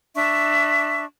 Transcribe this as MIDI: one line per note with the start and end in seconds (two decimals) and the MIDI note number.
0.15 1.04 62
0.15 1.04 76
0.15 1.04 85